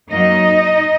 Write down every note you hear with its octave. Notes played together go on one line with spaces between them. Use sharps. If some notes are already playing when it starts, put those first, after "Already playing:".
F#2 F#3 A#3 D#4 D#5